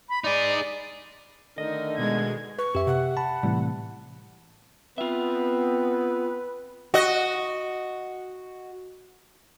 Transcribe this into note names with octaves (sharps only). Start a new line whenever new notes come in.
B5
D#4 G#4 D5
D3 D#3 A3 D#4 A#4 D#5
B2 G#3 G#6
B4 C#6
F#2 G4 E5
C3 F#5
A5 B5
A2 C3 E3 G3
B3 C4 F4 B4 E5
F#4 D#5